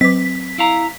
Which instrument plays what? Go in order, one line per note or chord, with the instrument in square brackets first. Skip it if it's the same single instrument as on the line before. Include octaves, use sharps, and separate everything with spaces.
[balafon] F#3 B4 D6 [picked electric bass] C4 [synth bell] B6
[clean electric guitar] E4 F5 A#5